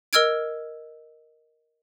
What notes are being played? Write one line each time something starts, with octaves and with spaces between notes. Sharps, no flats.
A#4 D#5 E6 F6 G#6 D7